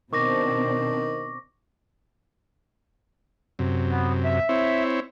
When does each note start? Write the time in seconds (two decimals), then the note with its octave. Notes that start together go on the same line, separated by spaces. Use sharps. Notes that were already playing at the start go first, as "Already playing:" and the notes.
0.13 B2 D#3 C4 D4 C#6 D6 A#6
3.59 F#2 C3
3.89 B3
4.24 E5
4.49 C4 E4 C#5